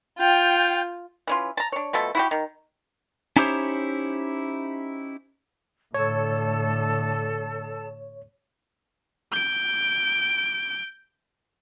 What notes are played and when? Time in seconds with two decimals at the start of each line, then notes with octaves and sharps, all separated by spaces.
0.19 F4 G5 G6
1.27 E3 C#4 F4
1.57 A5 A#5
1.72 D4 C#5
1.93 B2 F3 A3 A4
2.15 E4 F#4 G4
2.31 D#3
3.36 C#4 D#4 E4 G4 C5 C#5
5.94 A2 D3 A4 C#5 A5
9.32 G6 D7